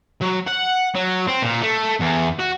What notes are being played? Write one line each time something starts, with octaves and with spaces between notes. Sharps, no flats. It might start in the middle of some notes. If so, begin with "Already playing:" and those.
F#3
F#5
F#3
C4
A#2
A3
E2
F#4